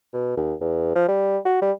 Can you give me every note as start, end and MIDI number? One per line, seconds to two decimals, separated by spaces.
0.13 0.35 47
0.37 0.54 39
0.61 0.94 40
0.95 1.06 53
1.08 1.38 55
1.45 1.59 66
1.62 1.72 55